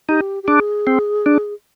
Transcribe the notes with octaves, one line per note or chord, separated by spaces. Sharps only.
D#4 G4
G4
D4 G#4
C4
D4